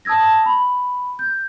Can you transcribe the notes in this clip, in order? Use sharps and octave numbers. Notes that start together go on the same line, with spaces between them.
A5 D#6 E6 G#6 A#6
B5
G6